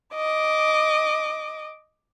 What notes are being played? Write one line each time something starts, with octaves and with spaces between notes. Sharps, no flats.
D#5 D6